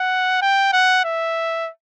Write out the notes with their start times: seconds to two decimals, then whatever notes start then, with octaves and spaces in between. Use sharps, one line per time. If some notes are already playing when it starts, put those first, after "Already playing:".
Already playing: F#5
0.42 G5
0.73 F#5
1.05 E5